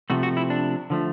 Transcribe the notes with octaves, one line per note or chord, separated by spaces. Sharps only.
C3 F3 A3 F#4
F#4
E4
D4
D3 F3 A3